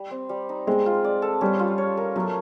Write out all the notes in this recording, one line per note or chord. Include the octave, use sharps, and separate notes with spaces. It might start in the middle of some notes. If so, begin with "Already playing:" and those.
Already playing: G3
C4
G3
D#4
G#3 C4
F4
D5
A4
G3 C#4
F4
C#5
A#4
F#3 A3